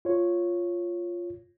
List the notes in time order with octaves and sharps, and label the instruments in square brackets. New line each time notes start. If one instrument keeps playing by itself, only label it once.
[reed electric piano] F4 C#5